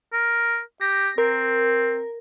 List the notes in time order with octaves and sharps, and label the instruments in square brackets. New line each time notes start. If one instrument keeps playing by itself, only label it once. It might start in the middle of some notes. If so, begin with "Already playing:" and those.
[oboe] A#4
[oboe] G4 [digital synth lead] A#6
[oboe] C4 [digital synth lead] A#4